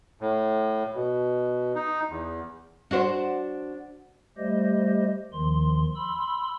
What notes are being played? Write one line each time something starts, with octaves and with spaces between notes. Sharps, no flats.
A2
B2
D#4
E2
D4 F#4 C5
G3 A3 G4 C5 D#5
D#2 D#3 F3 C6
B5 C6 E6